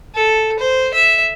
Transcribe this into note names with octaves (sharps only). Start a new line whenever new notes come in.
A4
C5
E5